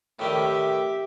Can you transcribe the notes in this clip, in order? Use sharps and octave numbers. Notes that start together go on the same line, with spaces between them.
A2 D#3 G3 G4 E5